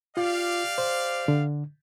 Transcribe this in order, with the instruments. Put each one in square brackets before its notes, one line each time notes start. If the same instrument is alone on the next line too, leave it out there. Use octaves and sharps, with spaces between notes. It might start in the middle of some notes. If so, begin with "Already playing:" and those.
[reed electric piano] F4 [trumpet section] G4 D5 F5
[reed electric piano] C5
D3